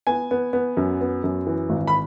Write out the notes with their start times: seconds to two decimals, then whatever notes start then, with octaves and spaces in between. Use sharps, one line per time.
0.07 B3 G#5
0.31 B3
0.53 B3
0.77 F#2
1.01 B3
1.24 F#2
1.47 E3
1.69 G#1
1.87 B5